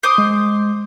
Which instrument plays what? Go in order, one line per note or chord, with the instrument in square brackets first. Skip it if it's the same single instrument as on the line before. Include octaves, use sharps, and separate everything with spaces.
[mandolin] C5 D6 D#6
[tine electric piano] G#3